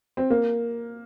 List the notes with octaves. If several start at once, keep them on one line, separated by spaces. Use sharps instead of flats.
C4
A#3